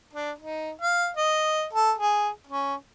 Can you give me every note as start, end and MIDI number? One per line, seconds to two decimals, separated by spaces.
0.13 0.31 62
0.39 0.71 63
0.81 1.09 77
1.17 1.64 75
1.73 1.92 69
1.98 2.29 68
2.47 2.75 61